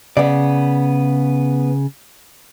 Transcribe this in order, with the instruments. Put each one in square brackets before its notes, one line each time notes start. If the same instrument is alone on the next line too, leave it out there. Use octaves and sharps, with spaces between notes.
[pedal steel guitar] C#3 [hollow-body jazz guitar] B3 D5